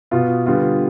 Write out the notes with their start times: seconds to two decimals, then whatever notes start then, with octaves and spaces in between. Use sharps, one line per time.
0.11 B2 B3 F4
0.46 D3 G3 B3 F4